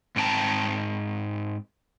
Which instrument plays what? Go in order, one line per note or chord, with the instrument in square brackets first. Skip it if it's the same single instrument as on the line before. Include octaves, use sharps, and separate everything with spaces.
[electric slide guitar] G#2 C4 G5 A5 A#5